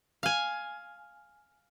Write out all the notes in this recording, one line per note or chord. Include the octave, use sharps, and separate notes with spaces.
F5 G#5